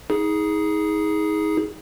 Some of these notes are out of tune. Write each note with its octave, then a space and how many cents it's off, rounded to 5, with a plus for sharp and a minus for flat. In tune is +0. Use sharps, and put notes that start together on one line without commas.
D#4 +35 G#4 +0